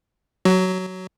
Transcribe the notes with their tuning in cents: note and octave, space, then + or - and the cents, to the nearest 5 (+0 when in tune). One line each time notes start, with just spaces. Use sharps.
F#3 +0 F#4 +25